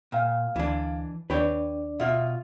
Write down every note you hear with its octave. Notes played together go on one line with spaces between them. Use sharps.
A#2 F5 G5
D2 E3 D4
D#2 D4 B4 C#5 D5 G5
B2 F4 E5